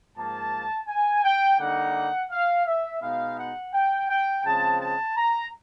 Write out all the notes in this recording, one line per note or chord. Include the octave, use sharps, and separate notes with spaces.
G#2 F3 A#3 A5
G#5
G5
D3 G3 A#3 D#4 F#5
F5
E5
B2 G#3 B3 D#4 F5
F#5
G5
G5
C#3 F3 G#3 C4 A5
A5
A#5